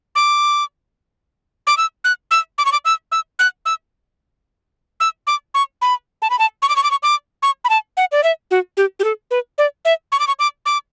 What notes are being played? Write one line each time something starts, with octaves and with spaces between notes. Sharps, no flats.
D6
D6
E6
F#6
E6
D6
C#6
D6
E6
E6
F#6
E6
E6
D6
C#6
B5
A5
B5
A5
C#6
D6
C#6
D6
C#6
D6
C#6
B5
A5
F#5
D5
E5
F#4
G4
G4
A4
B4
D5
E5
C#6
D6
C#6
D6
D6